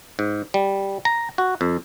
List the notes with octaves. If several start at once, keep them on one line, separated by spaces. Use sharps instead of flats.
G#2
G3
A#5
F#4
F2